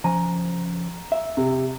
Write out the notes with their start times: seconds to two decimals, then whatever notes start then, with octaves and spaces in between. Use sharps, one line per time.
0.04 C#3 F3 G#5 A#5
1.12 E5
1.37 C3